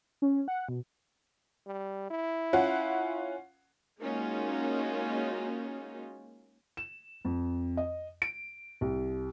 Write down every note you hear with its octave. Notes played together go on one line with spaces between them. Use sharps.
C#4
F#5
B2
G3
E4
C#4 F4 F#5
G#3 A#3 C#4 D#4 F4 F#4
E7
F2
D#5
D7
C2